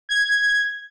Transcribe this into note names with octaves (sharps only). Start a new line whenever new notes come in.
G#6